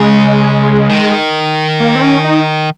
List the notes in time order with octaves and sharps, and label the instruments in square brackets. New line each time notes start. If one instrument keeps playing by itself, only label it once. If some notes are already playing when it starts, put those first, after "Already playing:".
Already playing: [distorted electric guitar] C#3 [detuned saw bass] G#3
[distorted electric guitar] D#3
[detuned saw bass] A#3
C4
C#4
D#4